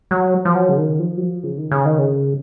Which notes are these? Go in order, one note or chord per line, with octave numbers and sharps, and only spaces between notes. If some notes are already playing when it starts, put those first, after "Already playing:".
F#3
F3
F#3
C#3
D#3
F3
F#3
F3
C#3
D#3
C#3
D#3
C#3